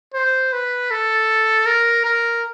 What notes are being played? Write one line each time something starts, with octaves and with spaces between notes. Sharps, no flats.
C5
B4
A4
A#4
A#4